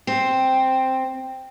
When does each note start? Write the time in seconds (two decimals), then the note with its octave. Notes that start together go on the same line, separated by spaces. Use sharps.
0.07 C4